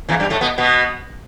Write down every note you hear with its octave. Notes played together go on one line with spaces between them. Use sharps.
E2 E3
G2 G3
A2 A3
B2 B3
B2 B3